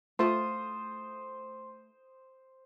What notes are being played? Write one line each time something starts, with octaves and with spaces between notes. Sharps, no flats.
A3 F4 C5 C6 D#6